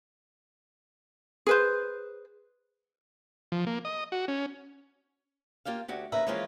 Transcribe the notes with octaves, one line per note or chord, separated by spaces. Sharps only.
G#4 B4 C5
F3
A#3
D#5
F#4
C#4
A#3 F4 G4 F5
D2 F#4 G4
D#2 C#3 B4 E5 A#5
E3 F3 G#3 A#3 C#4 F4